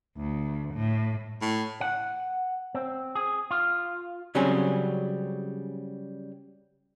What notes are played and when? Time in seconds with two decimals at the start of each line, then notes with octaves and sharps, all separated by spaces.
0.17 D2
0.74 A2
1.41 A2
1.81 F#5
2.75 C4
3.15 G#4
3.51 F4
4.35 C#3 F#3 G3 C4 C#4 G#4